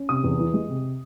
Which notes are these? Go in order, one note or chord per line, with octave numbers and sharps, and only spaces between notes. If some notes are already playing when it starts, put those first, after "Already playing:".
Already playing: C#4
C3 D#6
E2
E3
G#3
C3